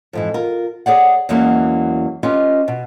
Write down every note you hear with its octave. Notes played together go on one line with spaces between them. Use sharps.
F2 G#2 E3
F4 A#4
G#4 C#5 D5 F#5
E2 E3 F#3 G#3 A#3 C#4
C#4 F4 G4 B4 D#5
B2